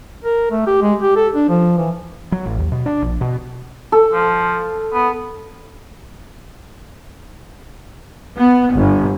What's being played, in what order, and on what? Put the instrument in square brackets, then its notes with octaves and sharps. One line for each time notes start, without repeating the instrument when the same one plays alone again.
[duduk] A#4
A3
G4
G#3
G4
A4
D4
F3
E3
[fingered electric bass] F#3
A1
D#2
B2
D4
A#1
B2
[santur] A4
[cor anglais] F3
B3
[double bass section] B3
G1